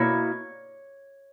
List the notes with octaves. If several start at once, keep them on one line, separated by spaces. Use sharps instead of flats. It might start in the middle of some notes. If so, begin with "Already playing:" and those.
Already playing: B2 A#3 E4 C#5